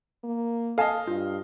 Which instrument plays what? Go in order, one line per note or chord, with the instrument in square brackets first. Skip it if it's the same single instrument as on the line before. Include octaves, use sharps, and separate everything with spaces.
[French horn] A#3
[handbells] A4 G#5 A5 [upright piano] D#5 F5
[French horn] G2 [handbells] F4